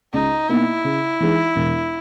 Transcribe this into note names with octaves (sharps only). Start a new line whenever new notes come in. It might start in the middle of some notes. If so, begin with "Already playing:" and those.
C#2 D#4
B2 A#3 D#4 E4
C#3
E3 G#3 D#4
E1